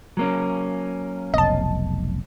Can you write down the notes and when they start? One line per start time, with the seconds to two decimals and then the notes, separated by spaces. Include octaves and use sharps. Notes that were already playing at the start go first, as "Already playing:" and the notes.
0.17 F#3 A#3 C#4
1.34 F1 B1 D#5 A5